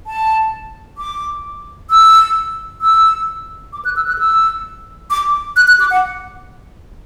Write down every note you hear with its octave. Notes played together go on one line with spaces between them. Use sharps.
A5
D6
E6
E6
D6
F#6
E6
F#6
E6
D6
F#6
F#6
D6
F#5